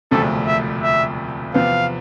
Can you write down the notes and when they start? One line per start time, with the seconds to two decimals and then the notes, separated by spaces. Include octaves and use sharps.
0.11 E1 D2 C3 F3 A3 A4
0.47 E5
0.83 E5
1.54 E2 C3 F3 B3 F5